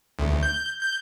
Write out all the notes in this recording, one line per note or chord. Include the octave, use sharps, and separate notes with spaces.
D2
G6
G6